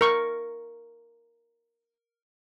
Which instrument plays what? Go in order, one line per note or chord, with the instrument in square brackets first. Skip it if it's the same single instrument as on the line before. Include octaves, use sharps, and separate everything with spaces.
[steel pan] A#4 C#6